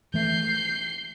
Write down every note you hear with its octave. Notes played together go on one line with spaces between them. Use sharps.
E3 A3 G6 C7